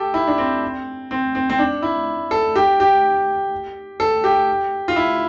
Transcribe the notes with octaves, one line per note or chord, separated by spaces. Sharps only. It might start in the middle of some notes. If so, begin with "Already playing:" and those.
Already playing: G4 A4
E4
D4
C4
C4
C4
C4
D4
E4
A4
G4
G4
A4
G4
F4
E4